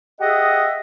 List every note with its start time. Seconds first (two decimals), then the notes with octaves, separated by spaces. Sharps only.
0.20 G4 G#4 D#5 E5 F#5